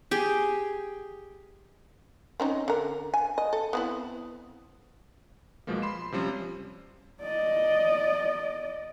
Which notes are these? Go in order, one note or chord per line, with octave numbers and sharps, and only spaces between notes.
G4 G#4
C4 C#4 D#4
D3 A#4
G#5
D#5
A4
B3 C4 E4
B1 B2 F3 G#3 A#3
B5 C6 C7 E7
C3 F3 G3 C#4
D5 D#5